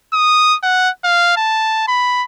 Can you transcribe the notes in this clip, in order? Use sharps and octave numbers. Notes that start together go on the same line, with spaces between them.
D#6
F#5
F5
A5
B5